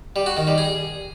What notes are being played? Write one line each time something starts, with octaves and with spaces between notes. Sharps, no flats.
G3
F#4
D#3
G3
G#4